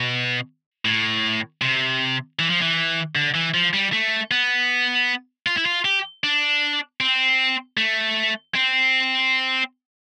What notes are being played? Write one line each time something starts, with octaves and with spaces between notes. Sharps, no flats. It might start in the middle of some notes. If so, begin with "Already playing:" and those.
Already playing: B2
A2
C3
E3
F3
E3
D3
E3
F3
G3
A3
B3
F4
E4
F4
G4
D4
C4
A3
C4